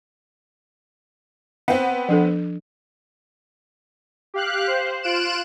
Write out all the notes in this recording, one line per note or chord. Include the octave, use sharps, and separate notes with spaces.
B3 C4
F3 D4 A4
G4 F5 F#6
C5
F4 F#6 D7 E7